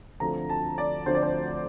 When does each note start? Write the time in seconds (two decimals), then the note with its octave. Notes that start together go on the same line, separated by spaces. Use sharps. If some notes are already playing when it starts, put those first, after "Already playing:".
0.20 D2 D3 F3 A3 C4 A#5
0.50 A5
0.78 D5
1.06 D2 D3 F3 A3 C4 C5
1.15 D5
1.23 C5